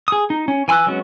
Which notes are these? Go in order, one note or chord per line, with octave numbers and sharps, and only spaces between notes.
G#4 D#6
D#4
C#4
E3 G#5 B5 E6 F#6
F#3 G#3 B3 C#4 F#4